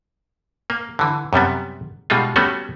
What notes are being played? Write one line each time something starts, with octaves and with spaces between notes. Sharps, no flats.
A#3
D3 E3
F#2 C3 G3 B3
B2 G3 G#3 D#4 F4
G3 A3 B3 C#4 F#4